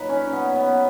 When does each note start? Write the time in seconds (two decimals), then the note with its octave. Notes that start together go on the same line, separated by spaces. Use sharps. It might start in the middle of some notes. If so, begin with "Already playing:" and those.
Already playing: A#2 F#3 D#4 B4
0.09 C#4
0.33 B3
0.56 B3